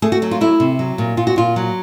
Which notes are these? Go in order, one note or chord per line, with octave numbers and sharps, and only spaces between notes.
A3 G#4
F#4
F#3
F4
A3 E4
C3
F#3
A#2
A#2 F4
F#4
A#2 F4
F#3